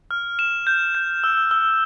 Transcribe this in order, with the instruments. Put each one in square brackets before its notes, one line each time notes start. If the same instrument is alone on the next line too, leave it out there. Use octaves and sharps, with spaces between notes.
[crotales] F6
E7
G6
G6
E6
E6